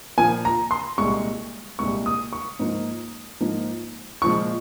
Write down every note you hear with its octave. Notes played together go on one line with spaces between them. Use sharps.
A#2 F3 A#3 G#5
A#5
C6
C2 A#2 G#3 C#6
C2 A#2 G#3 C#6
D#6
C#6
G#2 F3 A#3
G#2 F3 A#3
A#2 F3 G#3 C#6